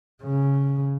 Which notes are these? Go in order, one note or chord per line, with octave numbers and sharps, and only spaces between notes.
C#3